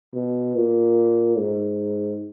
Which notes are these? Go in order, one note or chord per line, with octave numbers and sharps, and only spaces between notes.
B2
A#2
G#2